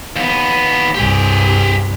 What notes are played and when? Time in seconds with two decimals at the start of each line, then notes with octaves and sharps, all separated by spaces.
0.16 D#2 B3
0.95 C2 G2 G4 G#4